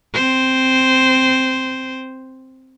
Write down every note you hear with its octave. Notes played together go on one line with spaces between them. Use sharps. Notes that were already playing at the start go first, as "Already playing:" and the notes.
C4 C5